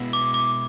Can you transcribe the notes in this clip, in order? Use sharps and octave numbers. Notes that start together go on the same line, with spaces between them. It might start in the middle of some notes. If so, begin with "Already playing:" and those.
Already playing: B2 G#3 B3 E4
D6
D6